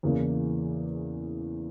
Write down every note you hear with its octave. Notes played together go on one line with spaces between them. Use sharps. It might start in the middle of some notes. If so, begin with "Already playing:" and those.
E2 C#3 E3 A#3